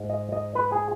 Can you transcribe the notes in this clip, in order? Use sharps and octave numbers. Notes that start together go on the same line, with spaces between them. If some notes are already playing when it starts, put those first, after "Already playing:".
Already playing: G#2
D#5
D#5
B4
G#4